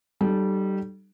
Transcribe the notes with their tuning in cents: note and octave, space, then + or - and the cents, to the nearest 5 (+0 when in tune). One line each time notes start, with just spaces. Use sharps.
G3 -20 D#4 -45 A4 -20